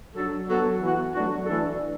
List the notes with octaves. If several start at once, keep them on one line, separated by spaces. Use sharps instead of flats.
F#3 D4 A4
F#3 B3 F#4 A4
E3 B3 F#4
F#3 A3 D4 F#4
E3 A3 D4 A4